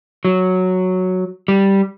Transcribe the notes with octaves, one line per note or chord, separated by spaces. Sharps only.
F#3
G3